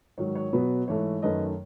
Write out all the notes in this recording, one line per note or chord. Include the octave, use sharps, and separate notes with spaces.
G#2 D#3 F#3 C#5
C#5
B2 F#3 B3 B4
G#2 E3 A3 C#5
F#2 D#3 A3 B4 D#5